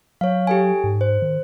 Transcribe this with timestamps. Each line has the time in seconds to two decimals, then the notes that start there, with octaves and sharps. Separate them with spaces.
0.21 F#3 C#5 F5
0.47 G4 A4 G#5
0.84 G#2
1.01 C5
1.22 D#3